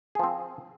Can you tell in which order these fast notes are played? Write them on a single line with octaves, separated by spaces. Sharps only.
G#4 F3 C4